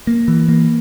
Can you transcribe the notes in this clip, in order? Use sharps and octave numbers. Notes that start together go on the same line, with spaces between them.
A#3
E3
A#3